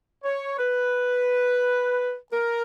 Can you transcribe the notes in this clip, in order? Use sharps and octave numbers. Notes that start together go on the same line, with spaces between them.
C#5
B4
A#4